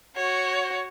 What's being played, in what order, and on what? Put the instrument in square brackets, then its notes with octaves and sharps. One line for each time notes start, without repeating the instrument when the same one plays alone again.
[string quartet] F#4 [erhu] C#5